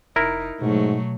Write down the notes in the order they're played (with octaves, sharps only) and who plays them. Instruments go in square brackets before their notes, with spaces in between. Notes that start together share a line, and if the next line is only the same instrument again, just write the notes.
[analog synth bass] F1 [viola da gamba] D#4 [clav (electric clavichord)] E4 A#4
[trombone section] G#2 [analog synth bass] B2 [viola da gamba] F#3 A3